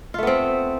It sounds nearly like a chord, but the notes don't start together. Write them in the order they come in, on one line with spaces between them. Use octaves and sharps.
F4 A3 B3 C4